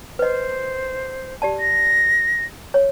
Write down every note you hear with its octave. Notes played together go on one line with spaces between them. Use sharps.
B4 C5 D#5
G4 D5 A5
A#6
C#5